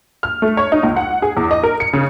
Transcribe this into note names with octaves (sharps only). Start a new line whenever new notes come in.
F6
A3
C#5
D#4
C#2
F#5
G#4
E2
D#5
A#4
C#7
C#3